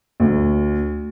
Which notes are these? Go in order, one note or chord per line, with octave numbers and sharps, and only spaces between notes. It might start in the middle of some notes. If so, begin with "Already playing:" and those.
D2